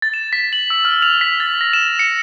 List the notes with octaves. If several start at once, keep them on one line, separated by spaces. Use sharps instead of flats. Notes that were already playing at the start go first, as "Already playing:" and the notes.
A6
E7
B6
F#7
E6
F6
F7
B6
A6
A#6
E7
C#7